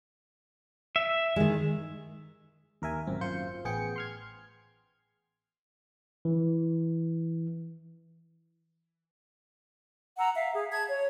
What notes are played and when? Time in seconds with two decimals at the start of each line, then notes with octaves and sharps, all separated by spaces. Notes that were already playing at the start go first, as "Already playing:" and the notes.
0.96 E5
1.36 D#3 G#3
2.82 D#2 A#4 E5 G#5
3.07 G#1 F#2 A#2 C4
3.21 F#2 F4 C5 G6 C#7
3.65 A1 B3 G#4 G5 C#7
3.96 C6 F6 G#6
6.25 E3
10.18 F#5 A#5 E6
10.35 E5 F5
10.53 G#4
10.71 A5 G#6
10.88 C#5